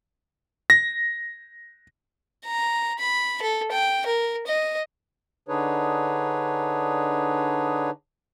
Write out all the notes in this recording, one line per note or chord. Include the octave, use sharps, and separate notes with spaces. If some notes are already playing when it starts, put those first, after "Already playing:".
A#6
A#5
B5
A4
G5
A#4
D#5
D3 D4 D#4 G#4 B4 C#5